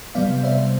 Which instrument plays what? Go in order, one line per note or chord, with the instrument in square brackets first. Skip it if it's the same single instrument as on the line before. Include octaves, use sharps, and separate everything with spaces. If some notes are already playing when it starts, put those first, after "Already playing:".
[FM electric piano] C3 G3 B3 D5 F5
C5 E5